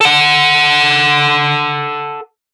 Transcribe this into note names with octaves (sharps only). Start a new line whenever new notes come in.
A4 F#5